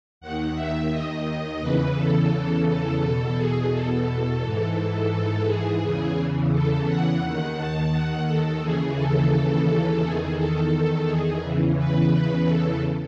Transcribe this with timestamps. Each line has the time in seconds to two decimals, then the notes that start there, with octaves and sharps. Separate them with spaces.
0.21 D#2 D#3 F#5
0.55 E5
0.90 D#5
1.61 E2 C#3 E3 B4
1.96 A4
2.66 A4
3.01 E2 B2
3.36 G#4
3.71 A4
4.42 G#2 E3
5.11 A4
5.46 G#4
5.81 E2 C#3 E3
6.52 A4
6.87 F#5
7.21 D#2 D#3
7.57 A5
7.92 F#5
8.26 A4
8.61 D#2 C#3 E3 G#4
8.97 A4
10.02 E2 D#3 G#4
10.36 A4
11.07 G#4
11.42 E2 C#3 E3
11.78 B4
12.12 B4
12.48 A4